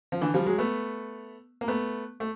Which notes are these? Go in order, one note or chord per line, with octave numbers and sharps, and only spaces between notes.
F3
D3 E3
F3 G3
F#3 G#3
A3 B3
A#3
A3 B3
A3